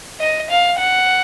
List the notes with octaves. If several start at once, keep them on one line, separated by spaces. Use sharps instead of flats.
D#5
F5
F#5